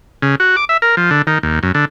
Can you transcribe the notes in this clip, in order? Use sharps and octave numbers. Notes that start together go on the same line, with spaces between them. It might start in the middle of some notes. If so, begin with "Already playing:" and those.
C#3
F#4
D6
E5
A#4
F3
D3
D#3
D#2
F#2
D3